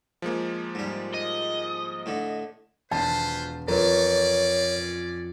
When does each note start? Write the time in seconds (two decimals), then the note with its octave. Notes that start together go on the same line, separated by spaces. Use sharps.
0.22 F3 G#3 A#3
0.75 G#2 G3
1.14 D#5
2.06 A2 D3
2.91 E1 F4 B4 C5 A5
3.68 F2 C#4 F4 A#4 B4 C#5 D5